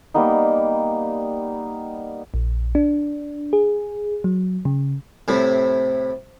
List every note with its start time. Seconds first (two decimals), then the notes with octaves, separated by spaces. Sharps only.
0.14 G3 A#3 B3 D#4
2.34 A#1
2.75 D4
3.53 G#4
4.24 F#3
4.65 C#3
5.28 A2 C3